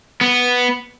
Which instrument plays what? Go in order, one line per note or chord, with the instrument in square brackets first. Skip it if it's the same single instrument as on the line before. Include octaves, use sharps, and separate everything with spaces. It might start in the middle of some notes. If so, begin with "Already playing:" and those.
[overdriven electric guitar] B3